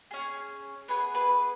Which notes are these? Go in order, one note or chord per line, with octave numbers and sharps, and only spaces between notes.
C#4 G#4
B3 G#4 B4
B4